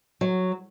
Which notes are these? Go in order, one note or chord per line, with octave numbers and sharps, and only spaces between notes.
F#3